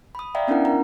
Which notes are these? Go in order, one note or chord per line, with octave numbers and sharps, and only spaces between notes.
B5 D#6
D5 E5 F5 G5 A#5
B3 C#4 D4 E4 A#4 F#5
A#4 A#5